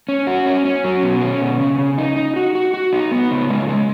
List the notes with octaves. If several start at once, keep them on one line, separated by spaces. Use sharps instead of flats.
C#4
F#4
C#4
C#4
F#3
B2
C#4
B2
C#3
C#3
D#4
D#4
F#4
F#4
F#4
D#4
B3
C#3
G#3
G#3